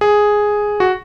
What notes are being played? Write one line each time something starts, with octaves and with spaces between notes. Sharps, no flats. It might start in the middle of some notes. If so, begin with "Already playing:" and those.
G#4
F#4